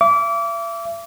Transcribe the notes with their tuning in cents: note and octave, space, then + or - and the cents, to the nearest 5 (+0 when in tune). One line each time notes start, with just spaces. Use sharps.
E5 +40 D6 -30